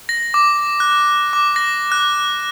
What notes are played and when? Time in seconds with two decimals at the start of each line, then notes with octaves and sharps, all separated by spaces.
0.09 A#6
0.34 D6
0.80 F#6
1.33 D6
1.56 A#6
1.92 F#6